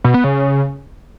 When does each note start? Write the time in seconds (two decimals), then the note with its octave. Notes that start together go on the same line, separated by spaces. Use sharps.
0.04 B2
0.14 B3
0.24 C#3